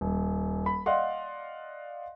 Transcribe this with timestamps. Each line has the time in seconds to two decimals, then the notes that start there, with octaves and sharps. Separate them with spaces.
0.01 D#1
0.66 B5
0.86 D5 D#5 F5 F#5 C6